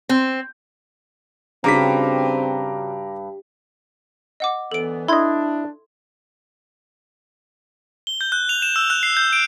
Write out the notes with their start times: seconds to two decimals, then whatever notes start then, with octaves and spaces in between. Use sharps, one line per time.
0.09 C4
1.64 G2 C#3 C4 F#4 A#5 D6 B6
4.40 D#5 F#5 D6
4.72 D2 E3 B3 A4 D7
5.08 D4 E4 D#5 C6 G#6
8.07 G7
8.21 G6
8.32 F#6
8.49 F7
8.62 E7
8.76 E6
8.90 F#6
9.03 C7
9.17 G6
9.33 D7